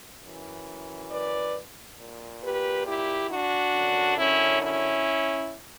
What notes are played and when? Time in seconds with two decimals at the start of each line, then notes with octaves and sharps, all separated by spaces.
0.23 F#2 E3
1.10 B4 D5
1.99 A#2
2.43 G4 B4
2.86 E4 G4
3.30 D4 F#4
3.74 F#2 D3
4.18 C#4 E4
4.62 C#4 E4